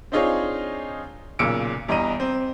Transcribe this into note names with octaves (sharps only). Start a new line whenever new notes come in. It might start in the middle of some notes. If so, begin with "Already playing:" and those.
C4 D4 D#4 F4 G#4 C#5
B1 A#2 C#3 E6 C#7 D7
E2 G2 D#5 A#5 D#7
C4